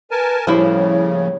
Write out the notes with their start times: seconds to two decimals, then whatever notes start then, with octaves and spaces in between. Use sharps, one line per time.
0.11 A#4 B4 G#5 A5
0.47 A2 C#3 F3 G3 A#3 E4 C5 C#5